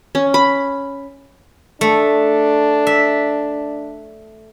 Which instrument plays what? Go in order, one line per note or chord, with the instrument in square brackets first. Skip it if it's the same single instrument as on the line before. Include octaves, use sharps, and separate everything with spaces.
[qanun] C#4
B5
[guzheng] A3 [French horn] D4
[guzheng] E5